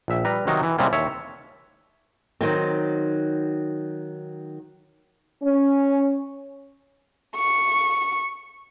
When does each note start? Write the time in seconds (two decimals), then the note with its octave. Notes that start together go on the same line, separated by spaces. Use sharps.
0.08 A#1 E5
0.25 G3 B4 A#5
0.47 C3 D#3 F#3 D#4
0.63 E3
0.78 C3 G3 G#3 A#3 C#4
0.93 D#2 C#5 E5
2.41 D#3 F#3 C4
5.43 C#4
7.36 C#6